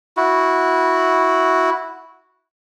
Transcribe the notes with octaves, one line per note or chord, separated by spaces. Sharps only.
E4 F#4